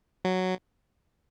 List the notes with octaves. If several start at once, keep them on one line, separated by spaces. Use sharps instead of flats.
F#3